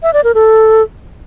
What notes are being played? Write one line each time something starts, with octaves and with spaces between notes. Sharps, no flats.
E5
D5
A#4
A4